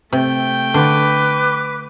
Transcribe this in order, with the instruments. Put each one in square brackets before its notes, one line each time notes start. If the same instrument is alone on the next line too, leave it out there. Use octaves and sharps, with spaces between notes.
[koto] C3 [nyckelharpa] A3 G5
[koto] D3 [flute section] B4 D6